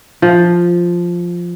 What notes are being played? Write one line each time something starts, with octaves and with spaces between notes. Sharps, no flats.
F3